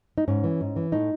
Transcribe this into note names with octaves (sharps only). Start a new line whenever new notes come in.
D#4
G#2 C#4
E3
G#2
E3
A2 D#4